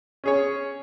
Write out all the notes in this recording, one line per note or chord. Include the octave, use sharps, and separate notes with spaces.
C#4 G#4 C#5